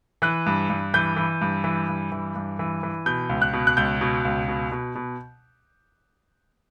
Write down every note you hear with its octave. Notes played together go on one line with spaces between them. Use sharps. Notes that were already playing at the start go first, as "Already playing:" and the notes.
E3 F#6
G2
G2
E3 G6
E3
G2
E3
G2
E3
G2
E3
E3
B2 G6
C#2
F#6
B2
F#6
C#2 G6
B2
C#2
B2
B2
B2